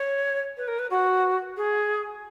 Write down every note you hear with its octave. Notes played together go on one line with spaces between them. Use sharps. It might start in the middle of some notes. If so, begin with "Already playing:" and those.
Already playing: C#5
B4
A#4
B4
F#4
G#4